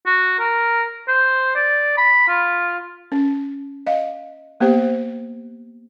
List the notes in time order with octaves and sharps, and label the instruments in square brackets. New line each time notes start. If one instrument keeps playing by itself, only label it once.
[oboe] F#4
A#4
C5
D5
B5
F4
[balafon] C#4
D#5 F5
A#3 B3 G4 C5